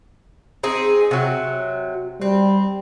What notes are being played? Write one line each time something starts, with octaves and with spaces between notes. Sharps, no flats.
C4 D#4 G#4
C3 F#3
G3 C4